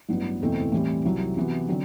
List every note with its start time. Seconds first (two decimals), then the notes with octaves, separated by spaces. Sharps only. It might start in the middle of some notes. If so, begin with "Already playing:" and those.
0.09 A1 G2 F#3 B3
0.40 F#1 E2 B2 A3 C4
0.72 A2 E3 G3 C4
1.05 C2 C3 F#3
1.37 C3 E3 B3 F#4
1.68 D3 F#3 C4